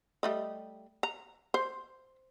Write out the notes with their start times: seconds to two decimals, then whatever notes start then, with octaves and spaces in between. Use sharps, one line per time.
0.23 G3 A3 D#5
1.03 A#5
1.54 C5